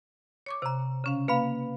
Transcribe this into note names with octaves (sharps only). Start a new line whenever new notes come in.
C#5 C#6 D6
C3 C5 A#5
C#3 C#4 F5
A#3 B4 F5 B5